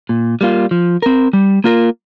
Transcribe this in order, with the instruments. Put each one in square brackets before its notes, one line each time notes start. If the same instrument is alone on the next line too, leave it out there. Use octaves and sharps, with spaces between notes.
[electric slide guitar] A#2
G3 A#3 F4
F3
C4 A#4
G3
A#3 F4 A#4